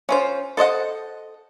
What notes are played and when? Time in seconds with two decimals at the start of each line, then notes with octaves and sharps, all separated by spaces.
0.09 C#4 F4 C5
0.57 A4 C5 D#5 F#5